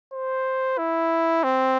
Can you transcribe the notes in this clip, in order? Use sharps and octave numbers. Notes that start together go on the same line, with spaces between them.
C5
E4
C4